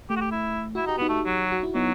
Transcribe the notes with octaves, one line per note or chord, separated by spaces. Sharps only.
A3 G4
F#4
G4
E4
E4 F#4
D#4 G4
B3
D#4 F#4
A3
F#3
F#4
E4
F#3 B3 D#4